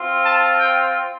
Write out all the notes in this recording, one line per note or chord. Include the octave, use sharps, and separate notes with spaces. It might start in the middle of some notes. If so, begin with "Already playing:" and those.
Already playing: C4 F4
A5
G5